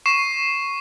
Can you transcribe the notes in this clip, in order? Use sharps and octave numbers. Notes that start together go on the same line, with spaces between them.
C#6 C7 E7